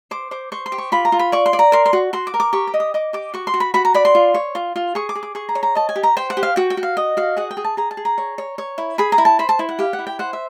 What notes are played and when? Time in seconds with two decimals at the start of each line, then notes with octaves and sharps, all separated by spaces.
0.11 C5 D6
0.31 C5 D6
0.52 C5 C#6
0.66 C6
0.72 G4
0.78 C#6
0.92 F4 B5
1.05 A#5
1.12 F4
1.19 B5
1.32 D5 C#6
1.46 C6
1.53 D5
1.59 A#5
1.72 A#4 C6
1.86 C6
1.93 F#4
2.13 F#4 C6
2.27 D6
2.34 A#4
2.40 D6
2.53 G4 C#6
2.67 D6
2.74 D#5
2.80 D#6
2.94 D#5 D6
3.13 G4 D6
3.34 F#4 C#6
3.47 C6
3.54 F#4
3.60 B5
3.74 F#4 B5
3.85 A#5
3.94 D5 B5
4.05 C6
4.15 F4
4.34 C#5
4.55 F4
4.76 F4
4.95 G#4 C#6
5.09 D6
5.15 G#4
5.23 D6
5.35 G#4 C#6
5.49 A#5
5.55 C#5
5.63 A#5
5.75 D#5 A5
5.89 G#5
5.96 G4
6.03 A#5
6.17 C5 G5
6.30 F#5
6.37 G4
6.43 F5
6.56 F#4 G5
6.70 G5
6.77 F#4
6.83 F5
6.97 D#5
7.17 F#4 F5
7.37 G#4 F#5
7.51 G5
7.57 G#4
7.64 A5
7.77 G#4 A#5
7.91 A5
7.97 G#4
8.05 A#5
8.18 C#5
8.38 C#5
8.58 C#5
8.78 E4
8.98 G#4 B5
9.12 A#5
9.18 E4
9.25 A5
9.39 C5 B5
9.49 A5
9.59 E4
9.69 F#5
9.79 G4 F5
9.93 F#5
9.99 E4
10.07 G5
10.19 C5 F#5
10.33 E5